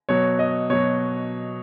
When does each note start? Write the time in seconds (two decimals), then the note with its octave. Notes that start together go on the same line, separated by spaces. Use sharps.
0.09 B2 F#3 C#5
0.39 D#5
0.70 B2 F#3 C#5